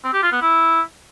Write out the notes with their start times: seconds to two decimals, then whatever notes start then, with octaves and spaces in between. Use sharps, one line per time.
0.04 C4
0.13 G4
0.23 F4
0.32 B3
0.42 E4